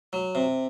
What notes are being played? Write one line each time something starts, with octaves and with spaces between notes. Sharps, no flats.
F#3
C3